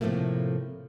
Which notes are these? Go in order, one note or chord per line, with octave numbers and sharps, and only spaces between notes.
A2 C3 E3 F3 A3 A#3